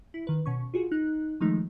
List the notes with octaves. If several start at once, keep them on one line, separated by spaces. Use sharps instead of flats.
E4
D#3 B4
B2 C#4 C#6
F4 F#4 G#4
D#4 F#6
D#3 F3 G#3 A3 D#4